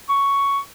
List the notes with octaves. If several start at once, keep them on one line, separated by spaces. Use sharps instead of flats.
C#6